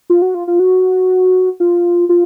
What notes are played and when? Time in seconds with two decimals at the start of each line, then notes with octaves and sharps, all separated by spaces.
0.10 F4
0.22 F#4
0.34 F4
0.47 F4
0.60 F#4
1.60 F4
2.09 F4